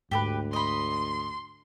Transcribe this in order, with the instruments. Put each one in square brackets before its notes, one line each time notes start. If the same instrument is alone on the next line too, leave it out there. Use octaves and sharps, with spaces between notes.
[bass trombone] D2 [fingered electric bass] G#2 [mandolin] G4 A4 B4
[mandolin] D#5 B5 [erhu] C6